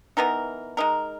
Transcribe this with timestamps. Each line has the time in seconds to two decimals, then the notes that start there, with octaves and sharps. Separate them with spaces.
0.17 E3 B3 D#4 A#4
0.77 G#3 D#4 A#4